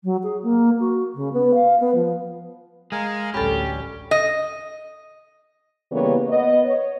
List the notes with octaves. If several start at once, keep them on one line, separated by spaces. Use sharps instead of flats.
F#3
G#4
A#3
F#4
C#3
B3
F5
B3
F3
G#3 A#4 F5 G#5
A1 D2 G3 C#4 G4 A4 B5
D#5
C#3 E3 G3 A#3 B3 C#5
B3 D#5
C#5